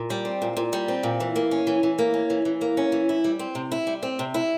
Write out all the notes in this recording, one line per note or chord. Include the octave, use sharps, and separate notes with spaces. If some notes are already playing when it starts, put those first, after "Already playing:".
Already playing: A#2
G3
C4
A#2
A#2
G3
C4
A#2
E3
A#3
C#4
E3
E3
A#3
C#4
E3
E3
A#3
C#4
E3
E4
G3
C4
C3
E4
G3
C4
C3
E4